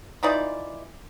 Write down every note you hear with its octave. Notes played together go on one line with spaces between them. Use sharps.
E3 D#4 F4 D5